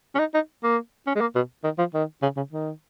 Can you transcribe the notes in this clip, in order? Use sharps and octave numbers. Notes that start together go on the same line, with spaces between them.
C#4
D#4
D#4
A#3
C#4
G#3
A#3
B2
D#3
F3
D#3
C#3
C#3
D#3